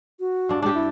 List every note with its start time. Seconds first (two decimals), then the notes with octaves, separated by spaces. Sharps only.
0.20 F#4
0.49 G2 D4
0.62 G#3 D4 G4
0.74 E4